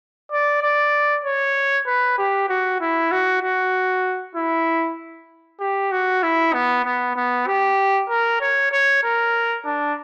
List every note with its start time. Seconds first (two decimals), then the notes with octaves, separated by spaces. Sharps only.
0.31 D5
0.62 D5
1.25 C#5
1.86 B4
2.18 G4
2.49 F#4
2.80 E4
3.12 F#4
3.42 F#4
4.35 E4
5.60 G4
5.92 F#4
6.23 E4
6.53 B3
6.85 B3
7.16 B3
7.47 G4
8.09 A#4
8.41 C#5
8.72 C#5
9.03 A#4
9.65 D4